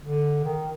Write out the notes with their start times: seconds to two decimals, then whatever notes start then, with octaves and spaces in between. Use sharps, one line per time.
0.01 D3
0.45 D#3